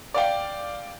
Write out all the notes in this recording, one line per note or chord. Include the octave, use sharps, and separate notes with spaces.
D5 F5 G5